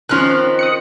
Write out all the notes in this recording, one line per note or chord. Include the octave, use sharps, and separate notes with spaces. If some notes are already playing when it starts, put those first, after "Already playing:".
D#3 F3 C4 C#4 F6 F#6
D#6 F#6 C#7